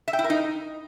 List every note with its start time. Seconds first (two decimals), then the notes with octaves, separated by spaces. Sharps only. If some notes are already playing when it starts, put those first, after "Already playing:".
0.08 E5
0.13 G5
0.19 E4
0.24 A#4
0.30 D#4